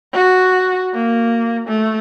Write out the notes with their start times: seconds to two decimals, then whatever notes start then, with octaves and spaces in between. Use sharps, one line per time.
0.14 F#4
0.94 A#3
1.68 A3